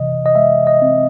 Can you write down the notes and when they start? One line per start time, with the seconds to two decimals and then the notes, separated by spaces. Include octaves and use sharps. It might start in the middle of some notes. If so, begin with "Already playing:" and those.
Already playing: C3 E3 D#5
0.26 D#5
0.35 G#3 E5
0.67 D#5
0.82 C4